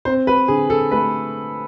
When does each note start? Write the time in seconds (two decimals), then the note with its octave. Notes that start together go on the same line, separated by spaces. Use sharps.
0.05 C4 C5
0.27 B4
0.48 D3 G#4
0.70 A4
0.91 A3 B4